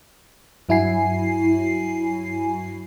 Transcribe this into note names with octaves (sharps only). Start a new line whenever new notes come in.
G2 F#3 E4 F#4 G#5 C7